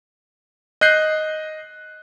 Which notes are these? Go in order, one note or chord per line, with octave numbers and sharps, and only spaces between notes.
D#5 F#6 G6 C7